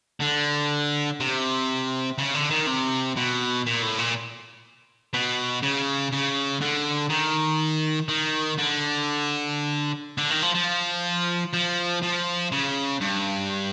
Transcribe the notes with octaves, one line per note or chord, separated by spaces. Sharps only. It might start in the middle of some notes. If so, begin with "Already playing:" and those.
D3
C3
C#3
D3
D#3
C3
B2
A#2
A2
A#2
B2
C#3
C#3
D3
D#3
D#3
D3
D3
D#3
F3
F3
F3
F3
C#3
G2